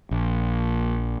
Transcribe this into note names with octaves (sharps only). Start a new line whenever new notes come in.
A#1